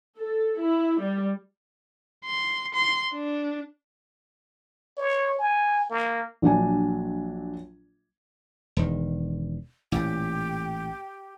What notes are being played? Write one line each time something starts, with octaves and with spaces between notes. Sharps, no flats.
A4
E4
G3
C6
C6
D4
C#5
G#5
A#3
A#1 F#3 D4 G#5
E1 D#3
A1 A#2 G4